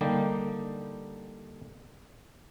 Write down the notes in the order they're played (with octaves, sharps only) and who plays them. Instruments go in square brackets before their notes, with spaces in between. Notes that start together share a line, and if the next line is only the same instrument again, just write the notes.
[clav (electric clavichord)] D3 G3 A#3 D#4 G4